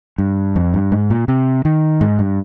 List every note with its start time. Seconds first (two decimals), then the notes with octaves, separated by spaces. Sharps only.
0.18 G2
0.56 F2
0.74 G2
0.92 G#2
1.10 A#2
1.28 C3
1.65 D#3
2.01 G#2
2.19 G2